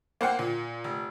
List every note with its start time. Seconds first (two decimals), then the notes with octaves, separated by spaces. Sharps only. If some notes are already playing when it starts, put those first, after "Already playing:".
0.21 A#3 C5 F#5 G5
0.39 A#2
0.84 F1